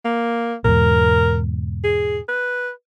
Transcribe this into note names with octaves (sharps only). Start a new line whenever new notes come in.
A#3
E2 G#2 B2 A#4
G#4
B4